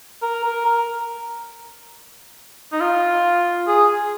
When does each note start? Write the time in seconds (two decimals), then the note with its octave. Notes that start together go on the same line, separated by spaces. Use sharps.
0.22 A#4
0.44 A#4
0.65 A#4
2.72 D#4
2.81 F4
3.67 G#4